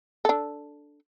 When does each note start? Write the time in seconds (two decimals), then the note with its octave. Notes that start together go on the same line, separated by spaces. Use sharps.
0.25 D4 A4